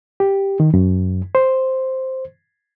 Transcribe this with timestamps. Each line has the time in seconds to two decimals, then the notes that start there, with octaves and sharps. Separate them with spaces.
0.20 G4
0.60 D#3
0.74 F#2
1.35 C5